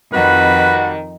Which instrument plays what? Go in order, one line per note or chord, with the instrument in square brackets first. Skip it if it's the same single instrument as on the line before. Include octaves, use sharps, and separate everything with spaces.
[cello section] F2 [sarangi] D#3 [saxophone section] G3 F#4 [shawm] B4